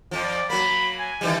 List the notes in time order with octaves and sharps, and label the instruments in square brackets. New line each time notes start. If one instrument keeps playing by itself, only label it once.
[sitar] F2 F3
[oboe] D5
[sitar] F#3 A#3 [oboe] B5
[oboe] G#5
[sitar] D#3 E3 G3